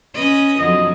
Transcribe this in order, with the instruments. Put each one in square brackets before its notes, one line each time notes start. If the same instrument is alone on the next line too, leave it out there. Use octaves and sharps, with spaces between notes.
[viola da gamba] C#4 B4 D#5
[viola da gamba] F2 D3 F#3 [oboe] D#5